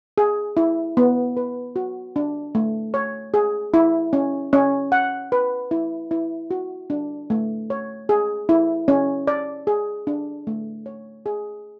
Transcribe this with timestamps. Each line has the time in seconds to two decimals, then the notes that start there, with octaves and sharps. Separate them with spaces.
0.18 G#4
0.57 E4
0.97 B3
1.37 B4
1.76 F#4
2.16 D4
2.55 A3
2.94 C#5
3.34 G#4
3.74 E4
4.13 C#4
4.53 C#4
4.92 F#5
5.32 B4
5.71 E4
6.11 E4
6.51 F#4
6.90 D4
7.30 A3
7.70 C#5
8.09 G#4
8.49 E4
8.88 C#4
9.27 D5
9.67 G#4
10.07 D4
10.47 A3
10.86 C#5
11.26 G#4